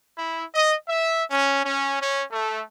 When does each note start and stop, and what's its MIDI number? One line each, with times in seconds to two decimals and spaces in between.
0.18 0.44 64
0.55 0.76 75
0.88 1.22 76
1.30 1.61 61
1.65 1.97 61
2.01 2.23 61
2.32 2.62 57